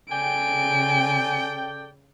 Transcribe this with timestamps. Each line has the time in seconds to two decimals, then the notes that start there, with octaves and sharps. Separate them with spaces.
0.11 C#3 A4 D5 G5 G#5 D7